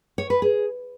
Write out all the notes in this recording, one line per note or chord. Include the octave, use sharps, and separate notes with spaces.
C#5
B4
G#4